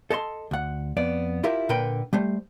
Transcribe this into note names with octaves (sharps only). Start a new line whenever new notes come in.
A4 D#5 A5 C6
D2 F#5
F2 B3 D5
E4 F4 G4 A#4 E5
A#2 D3 A#4 B4 G5 B5
G3 A3 C5